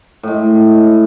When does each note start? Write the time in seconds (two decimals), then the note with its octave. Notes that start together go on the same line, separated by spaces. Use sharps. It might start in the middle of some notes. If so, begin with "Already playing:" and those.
0.23 A2 G#3